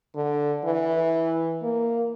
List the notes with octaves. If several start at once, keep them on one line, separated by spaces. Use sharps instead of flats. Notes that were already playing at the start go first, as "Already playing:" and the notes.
D3
E3
A#3